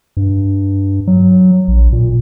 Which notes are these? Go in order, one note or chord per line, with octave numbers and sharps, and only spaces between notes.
G2
F#3
A#1
A#2